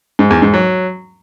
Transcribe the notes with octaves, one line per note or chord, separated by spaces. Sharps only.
G#2
E2
G#2
F#3